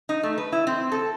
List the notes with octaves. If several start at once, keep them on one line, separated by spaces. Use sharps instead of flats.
D#4
A3
B4
E4
C4
A4